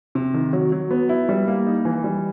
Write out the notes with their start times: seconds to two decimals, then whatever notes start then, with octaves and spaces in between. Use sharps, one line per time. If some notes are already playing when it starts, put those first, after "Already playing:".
0.15 C3
0.34 D#3
0.53 F#3
0.72 F#3
0.91 B3
1.09 E4
1.29 G3
1.47 A#3
1.66 D#4
1.85 E3
2.04 G3